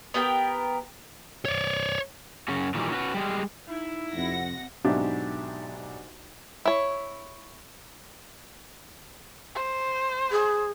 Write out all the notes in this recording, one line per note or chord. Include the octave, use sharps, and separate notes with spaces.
B3 G4 A#4 G5
C#5 D5
F#2 C#3 C#4 F#4
A#2 D#3 E3 F#3 G3
C#4 F#4 B4
G3 G#3
D#4 E4
F2 C3 F#5 A#6
B1 G#2 D4 F#4 G4 E5
E4 C#5
C5
G#4